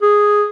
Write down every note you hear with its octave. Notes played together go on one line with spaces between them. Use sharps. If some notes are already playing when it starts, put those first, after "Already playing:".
G#4